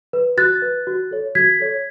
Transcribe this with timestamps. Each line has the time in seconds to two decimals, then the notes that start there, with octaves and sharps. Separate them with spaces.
0.13 B4
0.37 F#4 F#6 A6
0.62 B4
0.87 F#4
1.11 A4 C#5
1.35 F#4 G#6 B6
1.60 A4 C#5